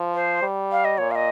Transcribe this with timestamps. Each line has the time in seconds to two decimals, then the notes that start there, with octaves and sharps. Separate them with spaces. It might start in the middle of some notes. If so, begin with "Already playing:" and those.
Already playing: F3
0.14 C5
0.42 G3
0.72 F5
0.85 D#5
0.98 A#2 C#5
1.11 F5
1.15 D#5